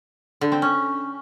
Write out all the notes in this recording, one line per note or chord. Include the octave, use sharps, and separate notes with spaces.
D3
C4
C#4